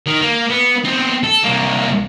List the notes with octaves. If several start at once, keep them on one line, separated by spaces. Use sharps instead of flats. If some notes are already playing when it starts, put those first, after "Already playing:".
D#3
A#3
B3
B3 C4
A4
C2 A#3